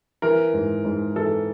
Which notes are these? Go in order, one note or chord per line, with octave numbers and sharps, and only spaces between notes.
E3 A#4
G#2
G#2
E3 A4